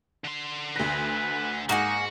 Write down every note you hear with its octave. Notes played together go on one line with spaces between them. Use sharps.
D3 C6
D2 B4 A#6
G#2 A#3 D#4 F#4 F#5 G#5